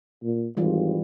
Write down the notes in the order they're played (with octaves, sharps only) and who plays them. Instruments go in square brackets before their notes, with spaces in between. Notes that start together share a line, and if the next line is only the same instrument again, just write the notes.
[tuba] A#2
[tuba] G#1 [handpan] E3 G3 F4